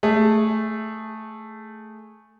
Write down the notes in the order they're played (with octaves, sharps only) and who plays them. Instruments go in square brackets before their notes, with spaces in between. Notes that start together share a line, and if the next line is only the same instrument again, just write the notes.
[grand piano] A3 G#4